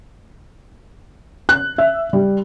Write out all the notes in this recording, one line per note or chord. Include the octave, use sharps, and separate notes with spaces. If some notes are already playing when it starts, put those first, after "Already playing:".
F#6
E5
G3